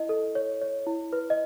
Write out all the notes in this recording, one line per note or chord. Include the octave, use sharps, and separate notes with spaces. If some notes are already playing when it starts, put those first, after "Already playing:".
Already playing: E4 D#5
A4
C#5
C#5
E4
B4
D#5